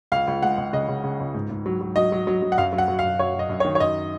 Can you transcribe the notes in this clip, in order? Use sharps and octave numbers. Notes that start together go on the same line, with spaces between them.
C#2 F5
C#2
G#3 F#5
C#2
C#3 D#5
C#3
C#3
C#2
G#2
G#2
F#3
F#3
F#3 D#5
F#3
F#3
F#3
F#5
F#2 F5
F#3
F#5
F#3
F5
F#2
F#2 C#5
F#2 D#5
F#2
C#5
D#3
C#5
F#2 D#5